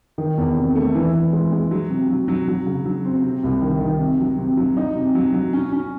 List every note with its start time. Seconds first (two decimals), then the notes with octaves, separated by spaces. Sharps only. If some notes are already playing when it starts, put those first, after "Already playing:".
0.18 D#3
0.38 E2
0.56 C3
0.75 A3
0.95 E3
1.14 E3
1.33 G#3
1.52 G#3
1.71 F#3
1.90 C3
2.09 F#3
2.28 F#3
2.48 F#3
2.66 C#3
2.85 F#3
3.05 C4
3.24 C3
3.44 C2
3.62 D#3
3.81 D#3
4.00 C3
4.20 F#3
4.38 C3
4.57 F#3
4.77 D#4
4.95 C3
5.15 F#3
5.34 F#3
5.53 C#4
5.72 C#4